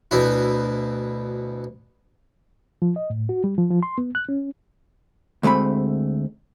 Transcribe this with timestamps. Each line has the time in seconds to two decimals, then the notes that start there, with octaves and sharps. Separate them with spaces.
0.11 D2 B2 E4
2.82 F3
2.96 D#5
3.10 A2
3.29 F#4
3.44 G3
3.58 F3
3.71 F3
3.83 C6
3.98 B3
4.15 F#6
4.29 C#4
5.43 D2 G#3 A3 C4 B5